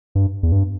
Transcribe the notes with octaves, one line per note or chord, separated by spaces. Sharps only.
G2
E2
G2